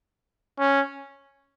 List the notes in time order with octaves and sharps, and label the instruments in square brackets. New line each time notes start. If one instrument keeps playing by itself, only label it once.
[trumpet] C#4